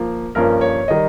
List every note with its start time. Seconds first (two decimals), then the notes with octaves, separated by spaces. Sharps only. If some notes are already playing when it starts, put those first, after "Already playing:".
Already playing: F3 A#3
0.35 G2 F3 A#3 C#4 A#4
0.61 C#5
0.88 D#3 G3 D#5